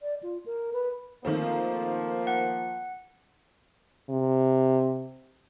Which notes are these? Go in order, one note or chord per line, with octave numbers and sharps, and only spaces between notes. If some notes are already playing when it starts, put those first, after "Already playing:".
D5
F4
A#4
B4
D#3 F3 A3 A#3 C4
F#5
C3